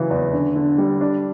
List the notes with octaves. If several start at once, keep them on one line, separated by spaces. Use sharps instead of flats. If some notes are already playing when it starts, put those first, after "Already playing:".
Already playing: C#3 E3 F#3
E2
D3
D3
G3
D4